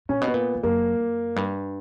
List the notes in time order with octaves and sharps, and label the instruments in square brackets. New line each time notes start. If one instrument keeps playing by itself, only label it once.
[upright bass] A#2 [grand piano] C#4
[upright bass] B2
[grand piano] B3
[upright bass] A#2
E2
[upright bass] F#2 [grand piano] A#3
[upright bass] F#2
G2